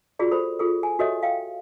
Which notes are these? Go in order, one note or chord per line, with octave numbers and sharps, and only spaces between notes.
F4 F#4 G#4 D5
A4 C5 B5
F4 G#4 A4
G#5
F#4 G4 A4 C#5 D#5 E5
F5 G5